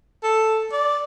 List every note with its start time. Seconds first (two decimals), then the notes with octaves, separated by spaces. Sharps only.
0.23 A4
0.73 D5